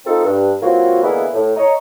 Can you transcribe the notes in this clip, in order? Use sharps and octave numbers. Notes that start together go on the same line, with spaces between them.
C4 D#4 F4 A4
G2
E3 F#3 A#3 C4 F4 F#4
D3 E3 G#3 A#3 B3 E4
A2
C#5 D#5 A#5